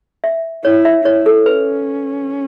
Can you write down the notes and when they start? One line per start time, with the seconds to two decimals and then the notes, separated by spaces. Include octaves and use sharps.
0.24 E5
0.64 E4 C#5
0.85 E5
1.05 E4 C#5
1.26 A4
1.46 C#4 B4